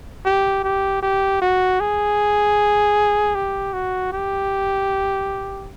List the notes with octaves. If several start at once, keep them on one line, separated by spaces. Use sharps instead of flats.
G4
G4
G4
F#4
G#4
G4
F#4
G4